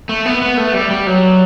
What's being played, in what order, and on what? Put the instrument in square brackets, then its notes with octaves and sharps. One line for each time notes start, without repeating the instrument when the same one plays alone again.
[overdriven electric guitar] A3
B3
B3
A3
G3
G3
F#3